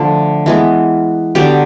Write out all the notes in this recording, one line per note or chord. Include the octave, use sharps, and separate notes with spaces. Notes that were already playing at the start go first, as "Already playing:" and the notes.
Already playing: D3 F3 A3
E3 G#3 B3
D3 F#3 B3 G4